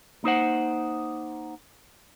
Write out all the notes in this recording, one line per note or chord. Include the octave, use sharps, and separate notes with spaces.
A#3 D#4 C5 F#5